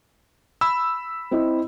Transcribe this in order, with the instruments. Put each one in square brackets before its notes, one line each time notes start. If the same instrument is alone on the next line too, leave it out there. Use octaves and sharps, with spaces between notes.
[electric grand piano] B5 E6
[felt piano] C4 E4 D#5